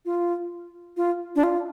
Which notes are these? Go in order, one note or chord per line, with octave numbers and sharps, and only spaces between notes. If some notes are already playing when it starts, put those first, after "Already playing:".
F4
F4
D4
F4